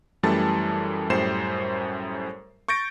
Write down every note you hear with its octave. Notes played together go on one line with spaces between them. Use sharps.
F#2 E3 G3 A3 A5 A6
F#2 A2 G3 C5 C7 E7
C#6 G6 A6 A#6 D7